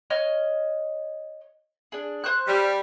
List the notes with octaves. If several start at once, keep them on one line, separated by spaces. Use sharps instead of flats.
C#5 D#5 F6
D4 G#4
C5 C#6 F#6
G3